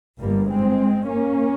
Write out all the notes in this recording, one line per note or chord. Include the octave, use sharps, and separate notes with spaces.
G1 G2 G3 A#3
G#3 C4
A#3 C#4